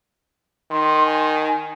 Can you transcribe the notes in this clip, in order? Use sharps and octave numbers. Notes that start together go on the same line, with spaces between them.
D#3 C6
G#5